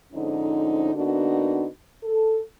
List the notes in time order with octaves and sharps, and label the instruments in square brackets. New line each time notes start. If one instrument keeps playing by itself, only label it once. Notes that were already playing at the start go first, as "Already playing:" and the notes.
[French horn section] F2 G#2 D3 C#4 D#4
D3 A#3 B3 D4 D#4 F#4
A4